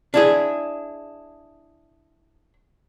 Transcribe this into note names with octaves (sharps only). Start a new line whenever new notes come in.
D4 E4 G#4